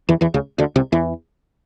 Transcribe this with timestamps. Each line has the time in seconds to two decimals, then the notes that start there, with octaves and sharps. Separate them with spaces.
0.09 E2 E3
0.21 E2 E3
0.34 C#2 C#3
0.58 D2 D3
0.76 C2 C3
0.92 E2 E3